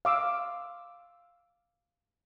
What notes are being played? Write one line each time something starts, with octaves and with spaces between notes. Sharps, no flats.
F5 D6 E6